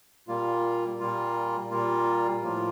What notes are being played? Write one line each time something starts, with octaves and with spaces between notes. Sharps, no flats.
A#2 G3 A#3 F4
A#2 G3 A#3 F4
A#2 G3 A#3 F4
A2 F3 A#3 F4